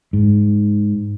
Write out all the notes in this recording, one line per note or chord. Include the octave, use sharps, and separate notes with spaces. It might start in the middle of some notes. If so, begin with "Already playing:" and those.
G#2